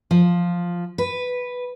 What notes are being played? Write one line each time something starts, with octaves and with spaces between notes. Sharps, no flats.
F3
B4